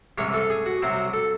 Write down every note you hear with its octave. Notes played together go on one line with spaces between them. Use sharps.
C2 C3 E3 G#3 C#4 C#5
A4
G#4
F#4
C2 C3 F#3 C4
A4